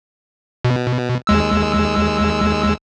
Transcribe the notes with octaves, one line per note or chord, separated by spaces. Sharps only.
B2
D#2 G#3 E6